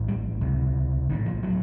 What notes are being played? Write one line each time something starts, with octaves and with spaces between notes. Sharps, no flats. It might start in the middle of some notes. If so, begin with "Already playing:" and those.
Already playing: A#1 A2
G3
C#2 C3
A#1 A2 D#3
F3
F#3